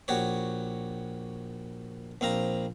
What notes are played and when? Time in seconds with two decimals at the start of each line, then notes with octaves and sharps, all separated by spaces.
0.08 A#1 F#4 G4 C#5
2.21 A#1 C4 F5 A#5